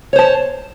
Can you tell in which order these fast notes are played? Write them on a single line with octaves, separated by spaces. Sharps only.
C#5 C5 A5